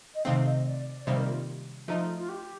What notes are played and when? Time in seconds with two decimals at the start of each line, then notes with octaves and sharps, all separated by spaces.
0.15 D#5
0.25 C3 D#3 A3 C4 F5
0.46 D#5
0.66 D5
1.06 C3 D#3 G3 A#3 C5
1.17 A#4
1.27 F4
1.88 F3 A3 D#4 F4
2.18 F4
2.29 G4